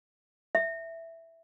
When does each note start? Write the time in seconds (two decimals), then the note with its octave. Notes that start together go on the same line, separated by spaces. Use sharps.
0.55 E5